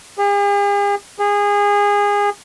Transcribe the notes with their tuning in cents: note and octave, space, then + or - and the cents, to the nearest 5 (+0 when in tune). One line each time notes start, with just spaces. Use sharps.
G#4 -45
G#4 -25